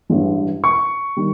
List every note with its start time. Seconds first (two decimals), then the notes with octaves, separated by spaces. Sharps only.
0.10 A1 G2 E3 G#3
0.64 C#6
1.17 D#3 G3